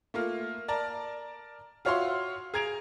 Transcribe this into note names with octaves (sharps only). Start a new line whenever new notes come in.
A3 A#3 F4
A#4 D5 A5 A#5
F4 F#4 C#5 E5 F5 C6
G#4 A#5 G#6 D7 F7